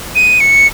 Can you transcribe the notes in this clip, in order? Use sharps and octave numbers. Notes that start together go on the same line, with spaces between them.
D#7
C#7